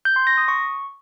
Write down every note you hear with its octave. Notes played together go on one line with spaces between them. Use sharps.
G6
C6
A#6
D#6
C#6